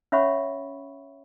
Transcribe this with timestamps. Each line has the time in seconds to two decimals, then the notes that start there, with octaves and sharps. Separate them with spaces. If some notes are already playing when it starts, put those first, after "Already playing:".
0.12 C#4 C#5 E5 F#5 B5 C#6